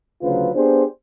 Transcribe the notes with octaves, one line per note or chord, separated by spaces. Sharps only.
D2 C#3 F#3 F4 B4 C5
B3 D4 G4 G#4 C5